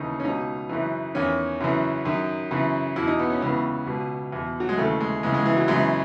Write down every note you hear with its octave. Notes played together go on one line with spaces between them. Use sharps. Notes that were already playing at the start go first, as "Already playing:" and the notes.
Already playing: D#2 C#3 E3 D#4
C#4
C#2 B2 D#4
F#2 C#3 E3
E2 D#3 C#4
F#2 C#3 E3
F#2 D#3
F#2 C#3 E3
E2 B2 E4
D#4
B3
C#4
C#2 C#3 E3 B3
C#2 B2
E2 B2
F#3
G#3
D#2 C#3 E3 A3
G#3
C#2 C#3 E3 G#3
G#3
E3
F#3
F#2 C#3 E3 G#3